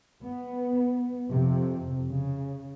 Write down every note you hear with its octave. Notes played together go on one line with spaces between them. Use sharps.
B3
F2 C3
C#3